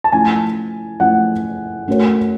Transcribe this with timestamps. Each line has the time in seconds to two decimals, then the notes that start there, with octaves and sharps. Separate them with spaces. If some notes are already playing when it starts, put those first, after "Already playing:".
0.04 A5
0.12 F3 A3 C#4 E4 G#5
1.00 F3 A3 C#4 E4 F#5
1.88 A3 C#4 F#4 A#4 C#5